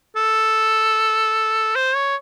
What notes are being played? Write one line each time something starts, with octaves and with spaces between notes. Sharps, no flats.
A4
C5
C#5